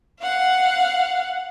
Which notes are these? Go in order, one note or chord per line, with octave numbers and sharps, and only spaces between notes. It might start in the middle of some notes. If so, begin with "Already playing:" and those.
F5 F#5